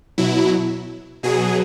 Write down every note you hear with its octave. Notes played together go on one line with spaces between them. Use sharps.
B2 F#3 E4
B2 F#3 G#4